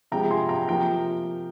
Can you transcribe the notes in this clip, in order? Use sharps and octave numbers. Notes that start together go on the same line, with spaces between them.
C3 F3 G#3 G5 A#5
G#5 C6
G5 A#5
C3 F3 A#3 G5 A#5